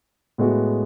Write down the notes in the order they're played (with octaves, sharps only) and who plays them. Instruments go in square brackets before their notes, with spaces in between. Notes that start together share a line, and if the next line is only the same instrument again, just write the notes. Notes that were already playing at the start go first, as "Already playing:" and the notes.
[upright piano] A2 G#3 B3 F#4